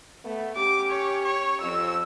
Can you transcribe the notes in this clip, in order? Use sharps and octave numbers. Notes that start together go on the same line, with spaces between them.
A3 B3
C#4 G4 D6
C#5
C#5
F2 E6